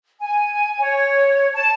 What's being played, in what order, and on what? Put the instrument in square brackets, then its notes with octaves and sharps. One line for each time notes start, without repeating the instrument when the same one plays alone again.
[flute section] G#5
C#5
A5